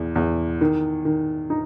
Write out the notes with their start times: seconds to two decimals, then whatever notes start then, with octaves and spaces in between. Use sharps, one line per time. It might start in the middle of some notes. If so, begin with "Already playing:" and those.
Already playing: E2
0.15 E2
0.61 D#3
1.05 D#3
1.50 D#4